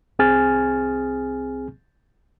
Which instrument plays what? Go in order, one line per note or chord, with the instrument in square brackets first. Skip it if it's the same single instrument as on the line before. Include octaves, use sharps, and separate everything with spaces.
[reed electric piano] C2 C4 G#4 G#5 F6 A6